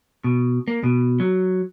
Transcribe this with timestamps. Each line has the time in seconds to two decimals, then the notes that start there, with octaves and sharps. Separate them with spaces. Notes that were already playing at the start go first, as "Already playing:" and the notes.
0.24 B2
0.68 A#3
0.83 B2
1.20 F#3